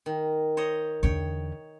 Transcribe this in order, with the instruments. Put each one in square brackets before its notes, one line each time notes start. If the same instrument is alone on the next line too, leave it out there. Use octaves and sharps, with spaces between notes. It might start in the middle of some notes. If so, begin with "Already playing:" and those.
[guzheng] D#3
C5 C#5 D#5
[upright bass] E2 D3 [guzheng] C#5 G5